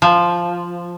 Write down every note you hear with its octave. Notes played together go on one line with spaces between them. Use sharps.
F3